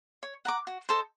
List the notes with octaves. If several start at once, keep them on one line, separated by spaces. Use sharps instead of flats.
C#5
F#5 A#5 D6
F#4
A4 C5 D#5